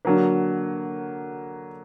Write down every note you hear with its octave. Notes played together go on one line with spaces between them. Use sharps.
D3 F#3 A#3